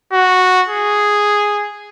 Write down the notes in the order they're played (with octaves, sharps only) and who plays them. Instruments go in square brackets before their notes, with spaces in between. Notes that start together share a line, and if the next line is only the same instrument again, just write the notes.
[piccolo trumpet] F#4
G#4